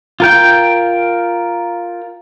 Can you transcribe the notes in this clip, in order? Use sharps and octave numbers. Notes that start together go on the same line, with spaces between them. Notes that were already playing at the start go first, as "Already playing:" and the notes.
F4 A#4 G5